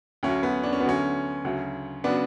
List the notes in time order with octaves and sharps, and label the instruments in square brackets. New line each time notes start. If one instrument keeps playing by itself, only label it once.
[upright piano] D2 D3 F#3 C#4
B3
D4
C#4
B3
D2 D3 F#3 C#4
D2 C#3 F#3
C#3 F#3 B3 D4